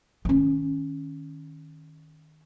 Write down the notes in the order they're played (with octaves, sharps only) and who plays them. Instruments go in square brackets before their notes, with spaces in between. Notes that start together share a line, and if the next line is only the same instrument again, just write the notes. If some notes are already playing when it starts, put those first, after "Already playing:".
[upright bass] D#3 C#4